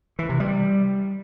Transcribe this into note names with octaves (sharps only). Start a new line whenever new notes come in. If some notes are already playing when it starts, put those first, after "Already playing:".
E3
C3
G3